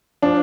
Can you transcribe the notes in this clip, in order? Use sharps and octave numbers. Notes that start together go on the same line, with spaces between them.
F3 D4